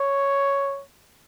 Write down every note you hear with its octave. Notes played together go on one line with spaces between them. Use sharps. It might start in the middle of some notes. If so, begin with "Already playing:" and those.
Already playing: C#5